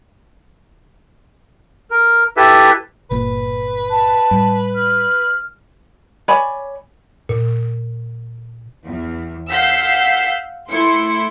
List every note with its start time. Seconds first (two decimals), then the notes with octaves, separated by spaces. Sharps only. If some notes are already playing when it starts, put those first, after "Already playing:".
1.91 A#4
2.37 E4 G4 A4 B4 E5
3.11 G1 A#2 A#3 B4
3.90 A5
4.31 A2 G3
4.75 F6
6.28 C#5 D5 G#5 B5
7.29 A#2
8.83 E2
9.50 F5 F#5 E6 G6 B6 C7
10.68 A3 E4 C6 C#7